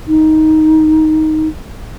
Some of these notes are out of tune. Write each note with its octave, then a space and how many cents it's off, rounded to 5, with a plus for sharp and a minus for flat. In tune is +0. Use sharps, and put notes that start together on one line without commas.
D#4 +5